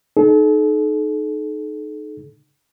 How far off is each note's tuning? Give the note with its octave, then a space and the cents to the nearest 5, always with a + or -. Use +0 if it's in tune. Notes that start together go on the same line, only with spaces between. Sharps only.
D#4 -20 A4 -40